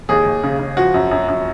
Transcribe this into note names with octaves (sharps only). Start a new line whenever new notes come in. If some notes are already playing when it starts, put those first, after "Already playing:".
D#2 G#4
D#2
C#3
C#3
F3 F#4
F#2
F#2
F#2